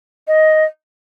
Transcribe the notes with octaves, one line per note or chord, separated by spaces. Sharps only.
D#5